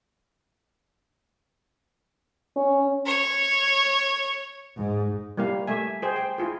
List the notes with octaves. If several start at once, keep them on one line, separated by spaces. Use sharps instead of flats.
C#4
C#5
G#2
G3 A#3 E4 F5
A3 E5 G#5
G#4 C5 G5
G5
E4 F4 G#4